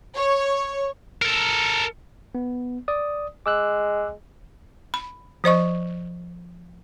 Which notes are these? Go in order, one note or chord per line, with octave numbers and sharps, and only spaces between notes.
C#5
A4 A#4
B3
D5 D#6
G#3 D6 E6 F#6
B5
F3 C5 D#5 C#6